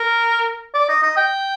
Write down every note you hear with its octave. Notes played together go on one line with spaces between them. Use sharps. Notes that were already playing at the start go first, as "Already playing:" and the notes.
Already playing: A#4
D5
D#5
D#5
G5